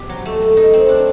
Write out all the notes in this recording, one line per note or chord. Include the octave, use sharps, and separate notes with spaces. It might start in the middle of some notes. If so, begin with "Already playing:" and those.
Already playing: B2 G4
F#3
A3
A3
D#4
C4
D4